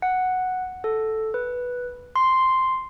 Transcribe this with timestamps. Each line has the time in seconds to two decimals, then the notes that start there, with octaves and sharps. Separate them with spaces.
0.02 F#5
0.84 A4
1.34 B4
2.16 C6